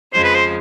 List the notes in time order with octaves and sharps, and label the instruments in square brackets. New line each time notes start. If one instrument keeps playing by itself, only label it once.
[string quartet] F2 C#3 F3 G#3 [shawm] C5
[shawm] B4
C5